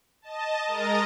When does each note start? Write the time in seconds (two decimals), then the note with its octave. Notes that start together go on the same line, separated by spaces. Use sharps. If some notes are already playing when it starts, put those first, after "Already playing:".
0.22 D#5 A5
0.68 G#3 A#4 D#5 A#5 D#6 A6